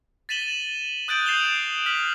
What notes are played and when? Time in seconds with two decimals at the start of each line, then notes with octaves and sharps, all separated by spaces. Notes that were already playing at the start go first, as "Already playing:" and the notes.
0.29 A6 B6 D#7 E7 F#7 G7
1.08 D#6 F#6 G6 A6 D7 F#7
1.26 D#6 G6 C7 E7 F7 G7
1.86 F6 B6 F#7